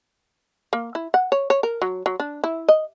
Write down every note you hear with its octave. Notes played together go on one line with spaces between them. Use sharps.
A#3
E4
F#5
C#5
C#5
A#4
F#3
F#3
D4
E4
D#5